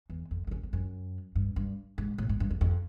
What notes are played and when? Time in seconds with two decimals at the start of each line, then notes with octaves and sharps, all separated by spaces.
0.10 E2
0.31 F2
0.47 F2
0.51 F#2
0.63 F2
0.73 F#2
1.35 G2
1.56 G2
1.98 G#2
2.18 A2
2.29 G#2
2.40 G2
2.50 F2
2.61 F2